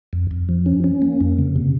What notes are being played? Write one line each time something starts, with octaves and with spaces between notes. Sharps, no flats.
F2
F2
F3
C#4
C#4
A#3
F2
C#3
C3